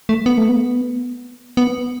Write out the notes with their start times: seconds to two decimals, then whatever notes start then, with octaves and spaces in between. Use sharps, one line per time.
0.09 A3
0.26 B3
0.38 A3
0.49 B3
1.57 B3